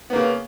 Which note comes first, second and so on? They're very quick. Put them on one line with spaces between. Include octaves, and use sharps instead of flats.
B3 A#3 C#3